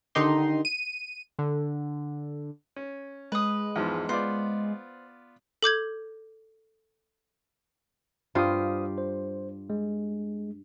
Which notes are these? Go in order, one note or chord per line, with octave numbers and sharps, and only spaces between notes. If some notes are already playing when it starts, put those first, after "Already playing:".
D3 D#3 D#4 G4 C6
D#7
D3
C#4
G#3 B4 D#6
E2 G#2 F3
B3 F4 C5 D5
A4 D6 G6 G#6
G2 F4 G4 C5 F5 D#6
C5
G#3